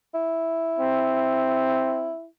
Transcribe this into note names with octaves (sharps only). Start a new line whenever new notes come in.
E4
C4